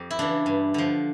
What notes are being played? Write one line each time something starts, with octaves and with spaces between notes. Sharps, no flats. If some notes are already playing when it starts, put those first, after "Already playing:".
Already playing: F2 G4
E4
C#3 E3 D4
G2
D3 F3